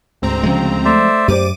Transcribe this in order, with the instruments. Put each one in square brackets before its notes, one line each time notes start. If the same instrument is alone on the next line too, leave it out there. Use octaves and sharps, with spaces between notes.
[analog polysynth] D2 C4 A#5 [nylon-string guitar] G#2
[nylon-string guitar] C#3 [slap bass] F3 G#3
[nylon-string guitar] A3 [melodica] C5 D5 E5
[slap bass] F#2 [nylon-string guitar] G4 C5 D5 [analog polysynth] D6 D#7